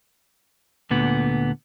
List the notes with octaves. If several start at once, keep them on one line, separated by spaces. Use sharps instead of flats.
D2 A#2 D3 B3